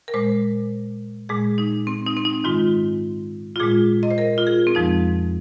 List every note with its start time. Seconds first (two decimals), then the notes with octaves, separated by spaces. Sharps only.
0.08 A#4
0.14 A#2 G#3 C5
1.29 A#2 G#3 G#4
1.58 D#4
1.87 C4
2.06 D#4
2.17 C4
2.25 D#4
2.44 G#2 D#3 G#3 F4
3.56 F4
3.60 A#2 G#3 G#4
4.03 D#5
4.11 C5
4.18 A#4
4.38 F4
4.47 G#4
4.67 C4
4.75 F2 F3 G#3 D#4